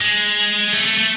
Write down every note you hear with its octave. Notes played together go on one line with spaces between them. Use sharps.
G#3
A3
A3
A3